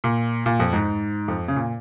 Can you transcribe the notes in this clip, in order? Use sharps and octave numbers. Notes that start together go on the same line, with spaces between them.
A#2
A#2
F2
G#2
F2
C#3
A#2